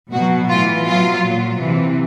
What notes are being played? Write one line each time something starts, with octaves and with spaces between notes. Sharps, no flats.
B2 F#3 F#4
A2 E3 F4
B2 F#3 F4
A#2 F#3
C3 E3